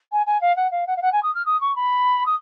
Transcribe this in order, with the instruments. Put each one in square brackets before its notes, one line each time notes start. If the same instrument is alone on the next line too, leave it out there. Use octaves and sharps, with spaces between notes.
[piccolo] G#5
G#5
F5
F#5
F5
F#5
F5
F#5
G#5
D#6
F6
D#6
C#6
B5
D#6